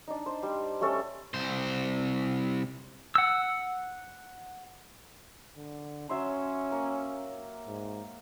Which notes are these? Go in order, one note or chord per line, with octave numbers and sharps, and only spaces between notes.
D4 D#4
C5
G3
G3 A3 C#4 A4
C2 C5
F#5 E6
D3
F#3 C#4 E5 C6
A#3 A#4
G#2